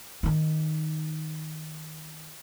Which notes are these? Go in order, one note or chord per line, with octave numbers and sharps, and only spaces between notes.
D#3 D#4